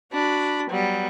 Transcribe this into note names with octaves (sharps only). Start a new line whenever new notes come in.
D4 F#4 B5
F#3 G3 B3